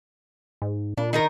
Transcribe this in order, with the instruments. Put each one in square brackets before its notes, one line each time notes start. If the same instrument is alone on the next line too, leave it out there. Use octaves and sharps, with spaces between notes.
[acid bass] G#2
[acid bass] A#2 [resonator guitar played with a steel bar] D4
[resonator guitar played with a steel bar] D#3 D#4 A#4